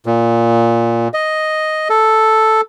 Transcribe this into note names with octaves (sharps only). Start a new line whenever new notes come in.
A#2
D#5
A4